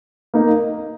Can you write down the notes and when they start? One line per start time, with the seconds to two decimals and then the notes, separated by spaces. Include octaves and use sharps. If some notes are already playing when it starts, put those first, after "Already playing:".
0.34 A#3 D#4